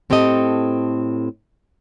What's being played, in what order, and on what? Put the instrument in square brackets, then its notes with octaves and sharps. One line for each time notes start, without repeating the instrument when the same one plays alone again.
[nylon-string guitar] A2 C4 G4 A4 D#5